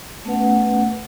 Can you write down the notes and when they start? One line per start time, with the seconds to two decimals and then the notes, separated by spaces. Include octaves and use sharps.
0.25 A3 B3 C#4 B4 F#5